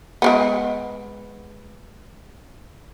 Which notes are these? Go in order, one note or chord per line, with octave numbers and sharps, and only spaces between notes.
G#3 A#3 B3